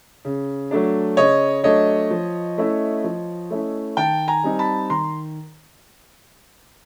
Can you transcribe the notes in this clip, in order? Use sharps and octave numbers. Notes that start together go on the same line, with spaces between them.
C#3
F#3 A3 D4
C#3 C#5 D#5
F#3 A3 D4 C#5 D#5
F3
A3 C#4 E4
F3
A3 C#4 E4
D#3 G5 A5
G#5 A#5
G3 C4 D#4
A5 B5
D#3 A#5 C6